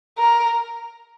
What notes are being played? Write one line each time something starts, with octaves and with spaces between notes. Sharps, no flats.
A#4